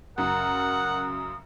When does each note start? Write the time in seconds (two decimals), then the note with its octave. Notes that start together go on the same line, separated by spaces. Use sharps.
0.18 F#2 C#3 A#4 F#5 D#6